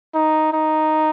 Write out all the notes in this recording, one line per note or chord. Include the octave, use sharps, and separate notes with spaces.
D#4
D#4